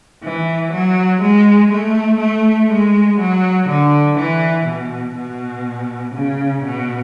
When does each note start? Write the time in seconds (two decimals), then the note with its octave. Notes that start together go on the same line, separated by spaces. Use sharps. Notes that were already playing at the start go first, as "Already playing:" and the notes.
0.23 E3
0.72 F#3
1.21 G#3
1.71 A3
2.20 A3
2.70 G#3
3.19 F#3
3.68 D3
4.18 E3
4.66 B2
5.16 B2
6.14 C#3
6.64 B2